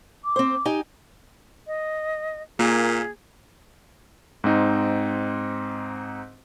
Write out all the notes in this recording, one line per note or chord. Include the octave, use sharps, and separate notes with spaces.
D6
C4 C5
D#4 G4 G#5
D#5
A#2 A#3 G#4
G#2 C4 D#4